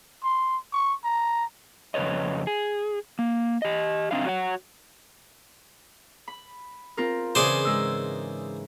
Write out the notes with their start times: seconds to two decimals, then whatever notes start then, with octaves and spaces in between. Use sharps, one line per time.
0.24 C6
0.73 C#6
1.04 A#5
1.94 F2 C#3 B4 C#5 D#5
2.47 G#4
3.19 A#3
3.62 G4 D#5
4.11 C4 D4 D#4 F5
4.25 F#4 C#5 F#5
6.28 B5
6.97 C4 F4 A#4
7.35 C#3 E3 G#4 C5 D5 G#5
7.65 G#2 E6